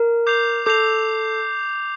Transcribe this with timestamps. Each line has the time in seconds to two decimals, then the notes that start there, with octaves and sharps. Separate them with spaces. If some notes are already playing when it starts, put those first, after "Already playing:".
Already playing: A#4
0.27 D6 G6 C7 F7
0.66 A4 D6 G6 C7 F7